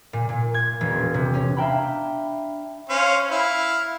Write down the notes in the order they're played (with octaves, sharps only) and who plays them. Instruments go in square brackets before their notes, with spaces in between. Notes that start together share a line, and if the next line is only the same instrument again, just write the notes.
[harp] A#2
A#2
G#6
E1
C3
C#4
D4 E5 F5 G5 A#5 B5
[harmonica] C#4 C5 F5
E4 F5